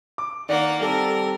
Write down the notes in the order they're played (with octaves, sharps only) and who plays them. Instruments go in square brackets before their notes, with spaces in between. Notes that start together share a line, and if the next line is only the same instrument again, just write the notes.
[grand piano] D6
[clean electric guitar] D#3 [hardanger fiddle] A#3 F#5 [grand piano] D5
[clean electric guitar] G3 C4 [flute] A4 [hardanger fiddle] A#4